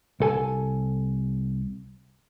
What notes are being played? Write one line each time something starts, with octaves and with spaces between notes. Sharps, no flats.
C2 A4 G#5